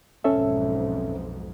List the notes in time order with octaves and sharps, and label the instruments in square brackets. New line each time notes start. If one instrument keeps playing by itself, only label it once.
[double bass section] B1 F2 G#2 [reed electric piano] C#4 A4 E5